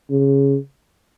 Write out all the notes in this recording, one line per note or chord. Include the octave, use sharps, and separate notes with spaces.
C#3